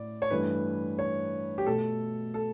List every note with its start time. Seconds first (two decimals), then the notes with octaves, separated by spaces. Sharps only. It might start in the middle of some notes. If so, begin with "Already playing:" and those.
Already playing: A2 D5
0.22 C#5
0.31 G2 E3 A3 B4
0.99 C#5
1.58 G4
1.66 B2 A3 A4
2.34 A4